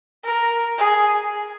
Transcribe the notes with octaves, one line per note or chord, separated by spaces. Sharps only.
A#4
G#4